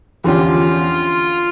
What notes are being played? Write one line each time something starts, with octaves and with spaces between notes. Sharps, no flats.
E2 D3 F3 C#4 F4 G4